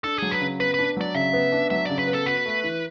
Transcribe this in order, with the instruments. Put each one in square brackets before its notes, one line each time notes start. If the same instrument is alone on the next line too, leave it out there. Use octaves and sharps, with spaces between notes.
[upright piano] D4 [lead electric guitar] A4
[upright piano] F#3 [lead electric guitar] G#4
[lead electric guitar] B4
[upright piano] C#3
[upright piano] B3 [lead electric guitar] B4
[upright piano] D4 [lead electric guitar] B4
[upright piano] F#3 [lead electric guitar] D5
[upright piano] C#3 [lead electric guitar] E5
[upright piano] B3
D4
[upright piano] F#3 [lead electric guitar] E5
[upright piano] C#3 [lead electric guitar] D5
[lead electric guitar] B4
[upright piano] B3
[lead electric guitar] A4
[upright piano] F#4 [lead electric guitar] B4
[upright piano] A3
E3